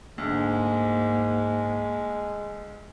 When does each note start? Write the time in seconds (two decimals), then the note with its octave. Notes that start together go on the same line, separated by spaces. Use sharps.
0.18 D2 G#2 G#3 A#3